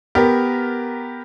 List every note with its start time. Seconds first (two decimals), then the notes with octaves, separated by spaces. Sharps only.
0.15 B3 G4 A#4